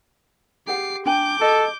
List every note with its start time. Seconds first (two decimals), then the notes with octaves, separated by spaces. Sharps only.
0.67 G4 G#4 F#5 D6 C7
1.06 D4 G5 G#5 D6 G6
1.41 F#4 G#4 A4 D#5